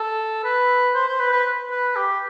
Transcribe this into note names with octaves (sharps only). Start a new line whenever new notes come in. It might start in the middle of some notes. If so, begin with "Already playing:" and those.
Already playing: A4
B4
C5
C5
B4
B4
B4
G4